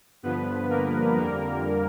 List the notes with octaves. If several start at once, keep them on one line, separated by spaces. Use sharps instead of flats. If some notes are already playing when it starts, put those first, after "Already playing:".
G2 D3 F3 B3 B4
A#3 A#4
F2 D3 G3 A#3 A#4